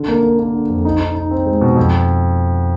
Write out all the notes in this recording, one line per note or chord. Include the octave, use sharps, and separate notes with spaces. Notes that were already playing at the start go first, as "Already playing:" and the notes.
Already playing: D3
A#3
A#3
A#3
D3
F2
D#4
D#4
D#4
C4
G#3
B2
F2